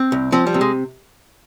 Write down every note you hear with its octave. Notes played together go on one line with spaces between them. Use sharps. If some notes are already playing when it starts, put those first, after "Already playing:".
Already playing: C4
C2
F3 C4
G3
C3
G#3